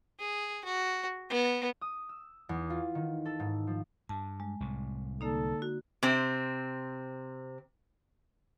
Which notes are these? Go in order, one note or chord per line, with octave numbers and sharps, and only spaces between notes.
G#4
F#4
B3
D#6
E6
E2
F4
D#3
A4
G#2
F3
G2 A5
G#3
C2 A2
D3 A#3 D#4 A4
F#4
C3 C4